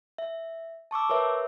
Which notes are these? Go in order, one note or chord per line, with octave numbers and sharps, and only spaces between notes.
E5
A5 C#6 D6 E6
A#4 B4 C#5 E5